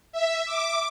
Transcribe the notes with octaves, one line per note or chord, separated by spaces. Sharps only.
E5
D6